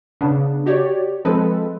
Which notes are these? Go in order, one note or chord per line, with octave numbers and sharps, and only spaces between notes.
C#3 B3 D4
F#4 G4 C#5 D5
F3 G#3 C4 A4 B4